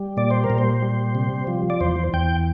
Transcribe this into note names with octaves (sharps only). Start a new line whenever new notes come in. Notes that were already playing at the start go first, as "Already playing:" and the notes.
Already playing: G3
A#2 D5
C5
A#4
A#2
C5
G3
C3
F3
D5
E2 C5
E2 G5